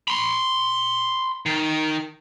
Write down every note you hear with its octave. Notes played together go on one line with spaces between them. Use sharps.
B5 C6
D#3